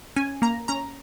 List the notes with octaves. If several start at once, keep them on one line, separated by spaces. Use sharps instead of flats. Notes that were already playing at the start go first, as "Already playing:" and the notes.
C#4 G#5
A#3 A#5
C#4 A#5